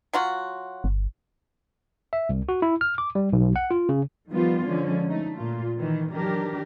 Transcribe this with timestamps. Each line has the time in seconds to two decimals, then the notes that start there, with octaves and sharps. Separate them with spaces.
0.13 F#3 F4 F#4
0.84 G1
2.13 E5
2.29 C2
2.49 F#4
2.62 E4
2.81 F6
2.98 D6
3.15 G3
3.33 B1
3.56 F#5
3.71 F4
3.89 C#3
4.31 D#3 F3 G3 B3 F4
4.67 D3 F3 G#3 C#4
5.09 A3 D#4
5.38 A#2 F4
5.78 D#3 E3
6.11 D#3 E3 F#3 D4 G4 A#4